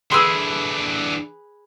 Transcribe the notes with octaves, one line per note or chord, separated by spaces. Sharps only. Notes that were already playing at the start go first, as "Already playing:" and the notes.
D3 E3 G#4 B4 G#5 C6 D#6 E6